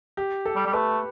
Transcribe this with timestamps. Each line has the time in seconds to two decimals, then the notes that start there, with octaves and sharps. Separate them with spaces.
0.17 G4
0.46 A4
0.56 G3
0.66 G3
0.73 A3 B4